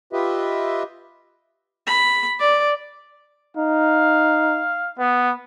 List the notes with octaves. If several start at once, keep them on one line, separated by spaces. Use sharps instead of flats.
F4 G4 B4 D#5 E5
B5
D5
D#4 F5
B3 B4